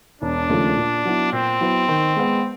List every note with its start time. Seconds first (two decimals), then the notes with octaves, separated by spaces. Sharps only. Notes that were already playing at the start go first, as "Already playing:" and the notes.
0.21 E1 D4
0.49 D#2 C#3 F3 A3
0.77 A#2
1.05 F#3 B3 E4
1.33 A#2 C4
1.61 F#3 B3 E4
1.88 D#3
2.16 G#3 B3